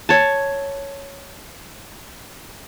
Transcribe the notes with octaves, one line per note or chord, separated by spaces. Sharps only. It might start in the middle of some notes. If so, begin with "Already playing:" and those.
C#5 A5